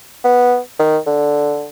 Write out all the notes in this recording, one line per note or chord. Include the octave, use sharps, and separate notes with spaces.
B3
D#3
D3